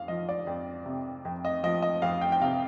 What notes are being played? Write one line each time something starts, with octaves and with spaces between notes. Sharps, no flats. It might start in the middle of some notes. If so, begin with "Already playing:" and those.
Already playing: F2 F5
F3 D#5
D5
F2
C3
F2
D#5
F3 D#5
D#5
F2 F5
G5
G5
C3 F5